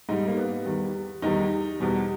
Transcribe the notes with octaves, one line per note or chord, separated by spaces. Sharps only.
G#2 G3 D#4
A#3
B3
E2 D#3 G3
E2 D#3 G3 D#4
E2 B2 G3